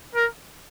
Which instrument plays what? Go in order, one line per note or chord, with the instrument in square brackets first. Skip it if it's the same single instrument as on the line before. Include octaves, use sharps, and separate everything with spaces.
[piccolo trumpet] A#4